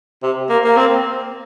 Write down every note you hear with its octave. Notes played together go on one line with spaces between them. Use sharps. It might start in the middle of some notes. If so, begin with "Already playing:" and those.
C3
A#3
A#3
C4